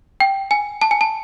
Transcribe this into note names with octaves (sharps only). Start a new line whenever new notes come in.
G5
G#5
A5
G#5
A5